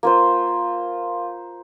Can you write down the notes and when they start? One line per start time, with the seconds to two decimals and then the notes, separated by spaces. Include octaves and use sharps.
0.03 A#3 F4 C5